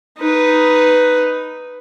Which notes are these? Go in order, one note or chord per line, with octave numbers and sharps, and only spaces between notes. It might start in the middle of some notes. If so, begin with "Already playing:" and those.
D#4 B4